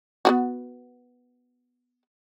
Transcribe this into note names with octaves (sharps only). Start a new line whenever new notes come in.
B3 F4 F#4